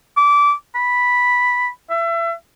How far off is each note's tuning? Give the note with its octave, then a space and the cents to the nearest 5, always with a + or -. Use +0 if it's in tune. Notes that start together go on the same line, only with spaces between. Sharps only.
D6 -20
B5 -5
E5 +30